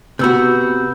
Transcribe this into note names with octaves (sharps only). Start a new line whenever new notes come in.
C3 B3 F#4 B5 E6 G6